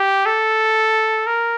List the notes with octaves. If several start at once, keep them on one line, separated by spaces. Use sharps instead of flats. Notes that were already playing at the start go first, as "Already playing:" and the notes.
Already playing: G4
A4
A#4